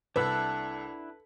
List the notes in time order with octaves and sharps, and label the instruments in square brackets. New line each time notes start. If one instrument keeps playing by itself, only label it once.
[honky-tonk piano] C2 E6 [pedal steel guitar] D4 E4 F#5 [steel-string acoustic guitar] A4 [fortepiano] B4